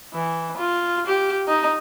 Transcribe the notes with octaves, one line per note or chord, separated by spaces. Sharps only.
E3
F4
G4
D#4